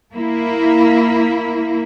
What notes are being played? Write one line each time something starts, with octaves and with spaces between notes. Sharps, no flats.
A#3 E4